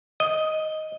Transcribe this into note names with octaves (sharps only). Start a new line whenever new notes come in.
D#5